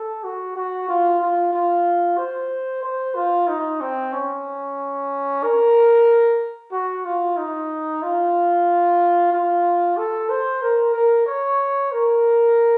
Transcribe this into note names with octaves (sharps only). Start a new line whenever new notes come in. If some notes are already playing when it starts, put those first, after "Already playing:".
Already playing: A4
F#4
F#4
F4
F4
F4
C5
C5
F4
D#4
C4
C#4
A#4
F#4
F4
D#4
F4
F4
A4
C5
A#4
A#4
C#5
A#4